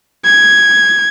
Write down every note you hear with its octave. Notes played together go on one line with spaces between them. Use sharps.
G#6